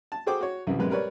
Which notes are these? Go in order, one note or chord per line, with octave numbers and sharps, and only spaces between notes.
A5
F#4 G#4 A4 C5 G5 D6
F#4 C#5
C2 F#2 C#3 E3
A#1 F#2 C3 G#3 B4
G3 A#4 B4 C#5 D5